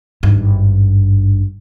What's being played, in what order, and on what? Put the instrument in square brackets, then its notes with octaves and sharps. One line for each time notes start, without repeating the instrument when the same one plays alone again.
[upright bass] G#1 G2